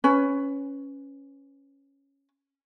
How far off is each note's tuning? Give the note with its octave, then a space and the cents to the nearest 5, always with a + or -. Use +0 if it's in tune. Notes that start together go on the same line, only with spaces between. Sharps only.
C#4 +0 B4 +15